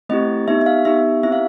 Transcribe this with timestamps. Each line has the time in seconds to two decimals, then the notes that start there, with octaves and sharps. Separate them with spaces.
0.09 A3 C4 E4 G4 D#5
0.47 B3 D#4 G4 E5
0.61 E5
0.66 F5
0.85 B3 D#4 G4 E5
1.23 C4 E4 G4 E5
1.32 F5